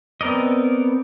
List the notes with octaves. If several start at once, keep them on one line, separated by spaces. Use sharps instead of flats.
B3 C4 A#4 D5 D#5